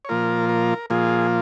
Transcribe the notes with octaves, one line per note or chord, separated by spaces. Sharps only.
C#5
A#2 F3 A#3 F4 A#4
A#4
A#2 F3 A#3 F4 G#4